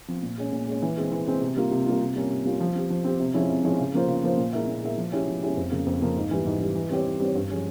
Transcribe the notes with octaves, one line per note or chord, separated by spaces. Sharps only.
F3 C4
A#2
G#3 C#4
A#2
G#3 C#4
E3
G#3 C4
E3
G#3 C4
C3
G3 A#3 F4
C3
G3 A#3 F4
C3
G3 A#3 C#4 F4
C3
G3 A#3 C#4 F4
F3
C4 G4
F3
C4 G4
C3
F3 G#3 C#4 E4
C3
F3 G#3 C#4 E4
C#3
F3 A#3 F4 C5
C#3
F3 A#3 F4 C5
A#2
G#3 E4 A#4 E5
A#2
G#3 E4 A#4 E5
F3
G#3 C#4 E4 G4
F3
G#3 C#4 E4 G4
F2
C#3 F3 A#3
F2
C#3 F3 A#3
G#2
E3 G3
G#2
E3 G3
E3
G3 C4 G4 C#5
E3
G3 C4 G4 C#5
G2
F3 G#3 C#4 G4